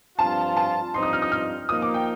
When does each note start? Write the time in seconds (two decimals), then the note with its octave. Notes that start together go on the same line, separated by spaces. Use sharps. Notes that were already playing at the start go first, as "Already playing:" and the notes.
0.18 G2 F3 C4 F4 A5
0.57 A5
0.93 G2 F3 C4 D#4 C6
1.03 D#6
1.13 F6
1.22 D#6
1.32 F6
1.69 F3 A#3 D#4 D#6
1.82 D6
1.94 G5